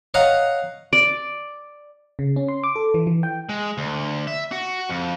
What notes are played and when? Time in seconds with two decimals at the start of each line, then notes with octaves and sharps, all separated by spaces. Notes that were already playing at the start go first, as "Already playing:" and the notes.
0.14 C#5 D#5 F5 F#5 A#5
0.93 D5
2.19 C#3
2.36 C#4
2.48 C6
2.64 D6
2.76 A4
2.94 E3
3.07 E3
3.23 G5
3.49 G#3
3.78 D2
4.27 E5
4.52 F#4
4.89 F2